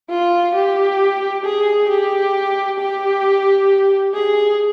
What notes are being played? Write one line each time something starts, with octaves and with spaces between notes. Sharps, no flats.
F4
G4
G#4
G4
G4
G#4